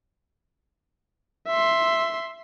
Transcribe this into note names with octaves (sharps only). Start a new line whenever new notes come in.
E5 C6